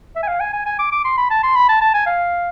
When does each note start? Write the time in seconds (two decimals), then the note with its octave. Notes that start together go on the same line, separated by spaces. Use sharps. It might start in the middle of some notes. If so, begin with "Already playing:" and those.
0.16 E5
0.23 G#5
0.28 F5
0.40 G#5
0.53 G#5
0.66 G#5
0.79 D6
0.92 D6
1.04 C6
1.18 B5
1.30 A5
1.43 C6
1.56 B5
1.69 A5
1.81 A5
1.94 G#5
2.07 F5